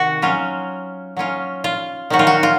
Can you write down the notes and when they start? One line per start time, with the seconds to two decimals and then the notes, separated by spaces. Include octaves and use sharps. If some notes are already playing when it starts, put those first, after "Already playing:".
Already playing: C3 D#3 F#4
0.22 F#3 C#4 F4
1.17 F#3 C#4 F4
1.64 F4
2.10 D#3 F#3 C#4 F#4
2.19 F4
2.27 F#4
2.43 F4